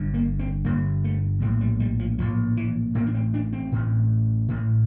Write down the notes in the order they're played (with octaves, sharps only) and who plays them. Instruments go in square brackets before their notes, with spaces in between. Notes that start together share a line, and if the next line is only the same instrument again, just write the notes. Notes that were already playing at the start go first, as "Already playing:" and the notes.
Already playing: [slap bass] G1 G2 D3
A#3
C4
G1 G2 D3 A#3
A3
A#1 A2 G3
G3
G3
F3
A#1 A2 F3
E3
A1 A2 A#3
D4
C4
D4
C4
A1 A2
A1 A2